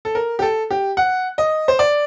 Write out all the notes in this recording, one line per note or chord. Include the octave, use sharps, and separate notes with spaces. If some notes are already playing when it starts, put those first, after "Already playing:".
A4
A#4
G4
A4
G4
F#5
D#5
C5
D5